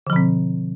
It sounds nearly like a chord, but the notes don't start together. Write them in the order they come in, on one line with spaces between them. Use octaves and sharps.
D3 F3 B2 C4